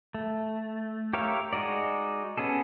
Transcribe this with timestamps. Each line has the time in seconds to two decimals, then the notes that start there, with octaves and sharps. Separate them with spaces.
0.15 A3
1.13 G4 A#4 C#5 E5 F5
1.53 G#3 D#4 F#4 D5
2.38 B3 C#4 G#4 A4